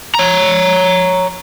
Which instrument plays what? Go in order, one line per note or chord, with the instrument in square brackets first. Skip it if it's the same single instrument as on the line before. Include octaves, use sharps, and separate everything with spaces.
[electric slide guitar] C#5 A#5